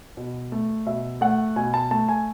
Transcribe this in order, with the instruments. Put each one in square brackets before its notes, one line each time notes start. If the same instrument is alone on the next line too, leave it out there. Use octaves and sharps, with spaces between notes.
[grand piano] B2
A3
B2 E5
A3 F#5
B2 G#5
A5
A3 A5
G#5